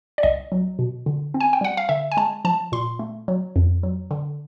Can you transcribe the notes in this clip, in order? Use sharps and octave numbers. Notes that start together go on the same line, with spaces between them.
D5
C2 D#5
F#3
B2
D3
C4
G#5
G5
G3 F#5
F5
D3 E5
G#5
G#3 A5
F3 A5
A#2 C6
A3
F#3
F2
F#3
D3